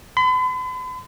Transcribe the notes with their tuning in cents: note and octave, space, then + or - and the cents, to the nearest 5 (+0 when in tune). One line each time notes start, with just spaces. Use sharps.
B5 +45